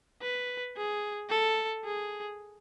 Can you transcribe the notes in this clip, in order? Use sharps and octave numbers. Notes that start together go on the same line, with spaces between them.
B4
G#4
A4
G#4